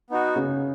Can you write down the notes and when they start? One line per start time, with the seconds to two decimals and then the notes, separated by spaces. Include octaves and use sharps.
0.10 B3 D#4 F#4
0.36 C#3